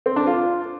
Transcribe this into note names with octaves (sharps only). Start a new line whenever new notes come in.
C4
D4
F4